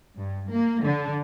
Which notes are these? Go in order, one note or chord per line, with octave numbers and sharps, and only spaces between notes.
G2
A#3
D3